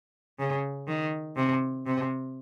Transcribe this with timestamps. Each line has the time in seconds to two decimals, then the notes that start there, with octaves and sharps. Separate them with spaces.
0.39 C#3
0.88 D#3
1.37 C3
1.86 C3